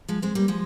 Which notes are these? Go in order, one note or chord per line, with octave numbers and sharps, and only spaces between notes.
F3 G#3
G#3 C4
G3 A#3
F3 G#3